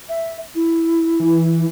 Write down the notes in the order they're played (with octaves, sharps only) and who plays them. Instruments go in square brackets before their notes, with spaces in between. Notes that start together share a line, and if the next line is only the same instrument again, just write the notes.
[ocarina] E5
E4
[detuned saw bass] E3